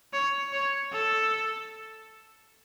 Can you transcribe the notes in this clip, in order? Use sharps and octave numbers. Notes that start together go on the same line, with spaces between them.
C#5
C#5
A4